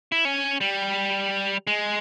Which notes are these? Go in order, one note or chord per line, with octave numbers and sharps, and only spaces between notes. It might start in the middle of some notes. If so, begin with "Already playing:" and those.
E4
C#4
G3
G#3